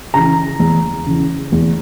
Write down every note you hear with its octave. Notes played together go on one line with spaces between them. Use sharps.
C#3 E3 A#5
E2
C#3 E3
E2